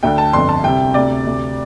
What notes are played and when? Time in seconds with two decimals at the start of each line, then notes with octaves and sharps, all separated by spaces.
0.03 D2 D3 G5
0.18 A5
0.33 G1 F2 D3 C6
0.49 A5
0.64 C2 C3 G5
0.94 D2 C3 D5
1.25 D2 C3